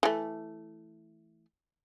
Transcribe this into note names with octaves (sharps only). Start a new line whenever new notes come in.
E3 A3